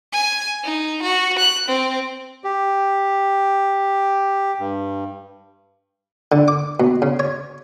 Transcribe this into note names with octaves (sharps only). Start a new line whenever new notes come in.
G#5
D#4
F#4
F#6
C4
G4
G2
D3
D6
B2
C#3
C#5